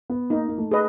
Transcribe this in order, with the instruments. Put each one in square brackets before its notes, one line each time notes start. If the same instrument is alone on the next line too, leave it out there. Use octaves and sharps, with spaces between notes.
[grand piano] B3
[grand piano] A#3 [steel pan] D#4
[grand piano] A#3
A3
[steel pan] G#4 B4 D#5